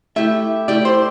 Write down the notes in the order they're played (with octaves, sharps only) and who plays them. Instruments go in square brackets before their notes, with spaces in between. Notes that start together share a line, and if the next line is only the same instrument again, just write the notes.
[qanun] A3 E4 G4 [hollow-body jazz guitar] E5
[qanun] A3 E4 G4 [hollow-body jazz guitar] D5
[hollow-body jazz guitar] C5